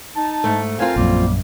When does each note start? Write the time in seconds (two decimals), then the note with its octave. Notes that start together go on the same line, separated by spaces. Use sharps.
0.16 D#4 A5
0.44 G#2 A3
0.79 F2 C4 F4 A#4 F5 G#5
0.96 A#1 F#2 F3 G3 A#3